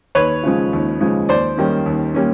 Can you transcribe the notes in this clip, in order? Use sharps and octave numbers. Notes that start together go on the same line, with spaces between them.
D#2 B4 C#5
C#3 F3 G#3
D#2
C#3 F3 G#3
D#2 C5 D5
D#3 G3 A#3 C#4
D#2
G3 A#3 C#4